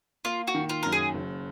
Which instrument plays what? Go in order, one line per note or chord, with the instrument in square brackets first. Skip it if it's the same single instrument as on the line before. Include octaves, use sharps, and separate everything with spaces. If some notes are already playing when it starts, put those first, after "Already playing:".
[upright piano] A#3 [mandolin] F4
[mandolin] F#4
[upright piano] D#3
[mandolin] F4
[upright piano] F#2 [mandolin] A#4
[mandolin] G#4
[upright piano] F#1